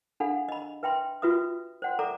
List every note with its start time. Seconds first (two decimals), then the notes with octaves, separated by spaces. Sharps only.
0.20 D4 G#4 A4 F5 F#5 B5
0.49 D#5 B5
0.83 B4 E5 G5 B5 C6
1.22 F4 F#4 B4 E5 D#6
1.82 C5 D5 F#5 G5 C6
1.99 A4 D5 E5 A#5 D6